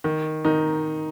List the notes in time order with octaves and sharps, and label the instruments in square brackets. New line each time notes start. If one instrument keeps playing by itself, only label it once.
[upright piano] D#3
D#3 D#4